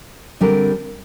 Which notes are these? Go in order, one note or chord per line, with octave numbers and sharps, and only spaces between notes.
D3 G3 C4 G4 A#4